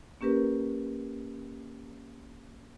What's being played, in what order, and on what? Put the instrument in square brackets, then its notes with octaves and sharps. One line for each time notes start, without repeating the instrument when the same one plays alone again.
[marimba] A#3 C#4 G4 A#4 B4